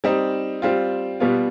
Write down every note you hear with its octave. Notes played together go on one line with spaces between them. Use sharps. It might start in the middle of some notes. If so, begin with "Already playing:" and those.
G3 C4 D#4
G3 C4 F4
B2 G3 B3 F4